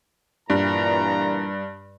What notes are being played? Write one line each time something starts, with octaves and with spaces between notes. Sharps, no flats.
G2 A#2 E3 A#5